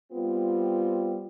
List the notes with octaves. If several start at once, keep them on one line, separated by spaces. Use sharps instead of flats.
G3 B3 C4 F4